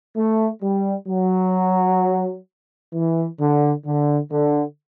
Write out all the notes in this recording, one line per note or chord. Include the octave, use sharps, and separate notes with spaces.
A3
G3
F#3
E3
D3
D3
D3